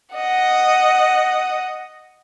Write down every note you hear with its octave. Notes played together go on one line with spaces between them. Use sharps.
D#5 F#5